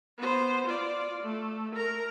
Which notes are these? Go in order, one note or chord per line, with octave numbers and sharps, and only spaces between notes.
B3 C5
F4 D5
A3
A#4 A#5